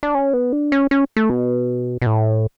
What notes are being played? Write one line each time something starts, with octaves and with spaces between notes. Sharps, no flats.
D4
C#4
B3
D4
C#4
C#4
A3
B2
B2
A2